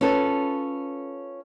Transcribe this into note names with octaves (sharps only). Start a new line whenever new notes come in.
C#4 F4 A4 B4